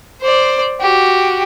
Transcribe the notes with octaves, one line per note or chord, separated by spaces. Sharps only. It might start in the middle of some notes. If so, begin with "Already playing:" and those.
C5 D5
F#4 G4